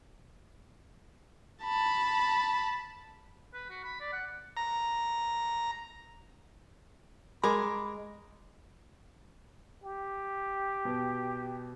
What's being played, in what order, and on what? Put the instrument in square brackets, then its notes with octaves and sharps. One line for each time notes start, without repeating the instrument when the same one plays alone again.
[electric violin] A5 B5
[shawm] B4
F#4
B5
D5
F#5
[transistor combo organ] A#5
[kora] G#3 [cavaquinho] A#4 G#5 D6 [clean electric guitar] B5
[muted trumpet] G4
[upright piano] B2